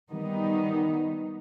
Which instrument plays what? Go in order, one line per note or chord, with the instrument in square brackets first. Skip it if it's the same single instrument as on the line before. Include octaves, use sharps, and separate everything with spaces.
[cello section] D#3 G3 B3 D#4